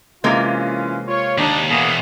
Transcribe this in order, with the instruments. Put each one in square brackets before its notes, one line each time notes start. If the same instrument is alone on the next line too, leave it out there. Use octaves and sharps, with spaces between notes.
[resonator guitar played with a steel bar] C3 G#3 A#3 [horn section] E3 C#4 F4
[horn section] F4 C#5
[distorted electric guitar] D#2 [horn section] D4 D#4
[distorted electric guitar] E2 B2 [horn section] A#3 G#4